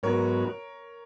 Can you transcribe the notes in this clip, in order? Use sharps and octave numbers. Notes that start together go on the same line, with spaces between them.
G#2 F#3 B3 D#4 F#4 A#4 C#5